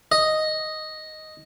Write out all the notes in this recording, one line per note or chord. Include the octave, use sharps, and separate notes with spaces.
D#5